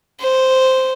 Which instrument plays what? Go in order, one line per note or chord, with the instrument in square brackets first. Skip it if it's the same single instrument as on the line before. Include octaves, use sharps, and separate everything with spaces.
[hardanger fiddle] C5